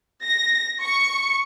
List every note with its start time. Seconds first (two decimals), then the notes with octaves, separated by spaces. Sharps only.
0.24 A#6
0.82 C#6